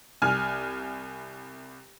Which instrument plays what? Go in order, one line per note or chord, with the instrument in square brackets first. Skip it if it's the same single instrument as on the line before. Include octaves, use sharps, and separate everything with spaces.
[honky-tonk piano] C2 G#5 F6